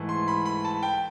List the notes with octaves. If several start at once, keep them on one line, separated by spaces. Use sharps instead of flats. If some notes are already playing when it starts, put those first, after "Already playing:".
Already playing: G#2 E3 A3
C6
B5
B5
A5
G5